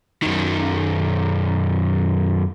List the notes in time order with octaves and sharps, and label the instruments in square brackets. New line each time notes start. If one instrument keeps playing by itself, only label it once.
[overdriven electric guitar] F#2 D#3